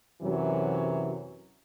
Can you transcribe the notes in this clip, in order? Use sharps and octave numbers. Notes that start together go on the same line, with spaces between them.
F#2 C3 E3 F#3